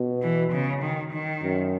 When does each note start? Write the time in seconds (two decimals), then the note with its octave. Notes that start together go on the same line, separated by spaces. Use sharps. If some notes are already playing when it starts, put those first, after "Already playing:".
Already playing: B2
0.22 E3
0.52 C#3
0.82 D#3
1.12 D#3
1.43 F#2